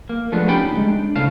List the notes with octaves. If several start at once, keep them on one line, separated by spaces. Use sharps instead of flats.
A#3
F3 G#3 A3 B3 D4
C#4 D#4 G4 A4 G5 B5
D2 G#3
D4
D2 A2 C#3 F5 A5